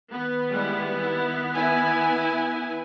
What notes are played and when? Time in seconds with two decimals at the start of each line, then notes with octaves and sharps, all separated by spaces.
0.12 D#3 B3
0.51 G3 G#3 E4
0.97 E4
1.54 E4 G#5